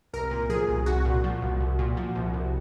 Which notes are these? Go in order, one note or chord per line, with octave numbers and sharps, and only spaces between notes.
C2 A#4
A#2
F3 G#4
C2
C2 F#4
A#2
F3
C2
C2
A#2
F3
C2
C2